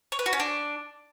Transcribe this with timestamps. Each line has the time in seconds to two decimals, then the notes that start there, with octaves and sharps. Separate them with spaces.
0.12 C#5
0.19 B4
0.26 F#4
0.33 C#4
0.40 D4